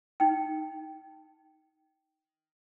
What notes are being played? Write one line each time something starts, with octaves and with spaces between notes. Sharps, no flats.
D#4 G5